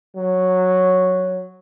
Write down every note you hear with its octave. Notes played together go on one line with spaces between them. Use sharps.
F#3